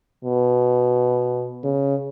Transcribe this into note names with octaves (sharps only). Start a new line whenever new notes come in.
B2
C#3